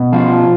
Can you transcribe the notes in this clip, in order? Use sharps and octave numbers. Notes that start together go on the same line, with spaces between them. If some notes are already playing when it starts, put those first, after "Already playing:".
Already playing: B2
F3 F4